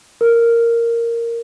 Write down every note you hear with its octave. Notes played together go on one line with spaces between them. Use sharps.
A#4